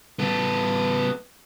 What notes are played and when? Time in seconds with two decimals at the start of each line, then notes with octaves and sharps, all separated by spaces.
0.19 B3 A4